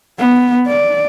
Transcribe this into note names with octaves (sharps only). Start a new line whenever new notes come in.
B3
D5